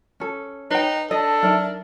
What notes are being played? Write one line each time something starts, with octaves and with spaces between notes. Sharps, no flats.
C#4 A4
D#4 B4 C#5 G5
D4 A4 D#5
F#3 D#4 A#4 D5 E5